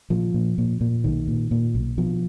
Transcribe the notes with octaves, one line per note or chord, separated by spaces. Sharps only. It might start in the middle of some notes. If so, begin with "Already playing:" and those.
A#2 F3
A#2
A#2
A#2
B1 D#3
A#2
A#2
B1
B2 F3